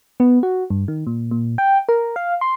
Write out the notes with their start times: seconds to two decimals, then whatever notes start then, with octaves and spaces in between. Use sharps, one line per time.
0.20 B3
0.43 F#4
0.70 G2
0.88 D#3
1.07 A#2
1.31 A#2
1.58 G5
1.89 A#4
2.16 F5
2.41 C6